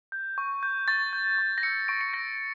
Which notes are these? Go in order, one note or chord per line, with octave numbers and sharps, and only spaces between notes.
G6
C#6
G6
C#6 A6
G6
C#6
A#6
E6 G6 C#7
C#6 D7
C#7
E6 G6 A#6